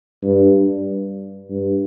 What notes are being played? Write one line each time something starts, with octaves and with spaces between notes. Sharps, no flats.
G2
G2